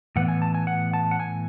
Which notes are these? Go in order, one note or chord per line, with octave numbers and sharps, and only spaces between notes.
A2 E3 B3 F#5
G#5
A5
G#5
F#5
A5
F#5
G#5